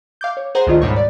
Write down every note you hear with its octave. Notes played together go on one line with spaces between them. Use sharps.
F5 D6 G6
C#5
G#4 C5 F#5 A#5
D2 D#3 F4 D#5
G#2 B2 G3 C#5 C#6
D5